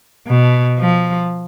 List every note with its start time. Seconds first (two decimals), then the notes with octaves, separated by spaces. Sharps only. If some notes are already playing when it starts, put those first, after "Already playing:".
0.28 B2
0.79 F3